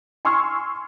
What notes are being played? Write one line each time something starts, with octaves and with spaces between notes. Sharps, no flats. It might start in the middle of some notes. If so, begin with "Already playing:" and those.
G#5 C6 C#6 E6 F6 G#6